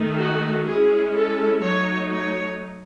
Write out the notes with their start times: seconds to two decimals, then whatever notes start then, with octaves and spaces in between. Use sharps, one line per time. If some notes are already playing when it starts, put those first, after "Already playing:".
Already playing: D#3 A3 D#4
0.18 F#4
0.66 G#3 C#4 E4 G#4
1.14 A4
1.62 F#3 A3 D#4 C#5
2.11 C#5